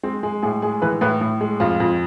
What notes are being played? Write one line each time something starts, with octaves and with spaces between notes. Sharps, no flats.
G#3 C4
G#3 G#4
A2 G#4
G#3 G#4
E3 B4
A2 B4
A2
G#3
F2 F4
F2